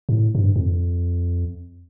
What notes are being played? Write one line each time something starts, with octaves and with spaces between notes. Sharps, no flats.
G2
A2
G2
F2